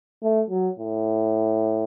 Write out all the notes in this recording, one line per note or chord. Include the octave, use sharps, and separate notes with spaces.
A3
F#3
A2